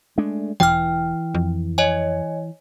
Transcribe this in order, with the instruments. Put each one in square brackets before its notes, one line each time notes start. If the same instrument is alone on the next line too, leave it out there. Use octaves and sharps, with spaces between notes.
[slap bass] G#3 A3 D4
[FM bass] E1 [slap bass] E3 [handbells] G5 F6
[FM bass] F2
[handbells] C#5 D#5 G#5